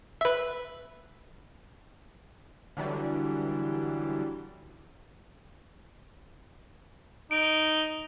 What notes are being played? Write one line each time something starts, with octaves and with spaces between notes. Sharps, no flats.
B4 E5
D3 E3 F#3 G3
D#4 D7